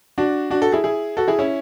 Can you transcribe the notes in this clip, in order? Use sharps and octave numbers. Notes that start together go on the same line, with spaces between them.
D4 F#4
D4 F#4
F#4 A4
E4 G#4
E4 G#4
F#4 A4
E4 G#4
C#4 E4